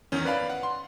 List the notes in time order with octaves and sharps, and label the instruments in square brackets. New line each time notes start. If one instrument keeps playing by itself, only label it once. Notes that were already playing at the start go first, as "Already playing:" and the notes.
[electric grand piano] E2 D#3 C#4
B4 D5 F5 B5
F#5
C6